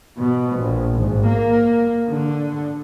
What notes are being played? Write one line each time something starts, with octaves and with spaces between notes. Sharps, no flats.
B2
A#1
G#1
A#3
D3